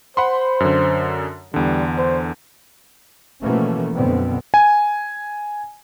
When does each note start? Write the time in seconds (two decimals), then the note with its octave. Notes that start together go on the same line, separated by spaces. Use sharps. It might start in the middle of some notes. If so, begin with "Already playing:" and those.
0.17 C5 F#5 B5 C6
0.60 F#2 D3
1.54 E2 D3 G3
1.98 C5
3.42 B2 E3 F3 A3 A#3 C#4
3.95 B1 F#2 B2 D3 B3 C4
4.54 G#5